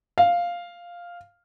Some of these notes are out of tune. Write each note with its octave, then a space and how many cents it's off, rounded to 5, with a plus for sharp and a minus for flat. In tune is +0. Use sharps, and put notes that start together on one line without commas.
F5 +0